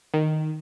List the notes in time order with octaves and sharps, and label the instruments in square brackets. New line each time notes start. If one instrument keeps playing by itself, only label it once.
[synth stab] D#3